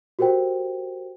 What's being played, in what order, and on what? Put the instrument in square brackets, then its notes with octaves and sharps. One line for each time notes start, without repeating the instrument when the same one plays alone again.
[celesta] F#4 G4 A#4 C5 G5